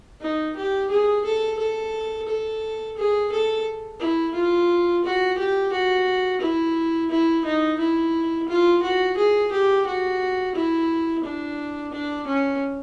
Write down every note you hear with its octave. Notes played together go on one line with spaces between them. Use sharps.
D#4
G4
G#4
A4
A4
A4
G#4
A4
E4
F4
F#4
G4
F#4
E4
E4
D#4
E4
F4
F#4
G#4
G4
F#4
E4
D4
D4
C#4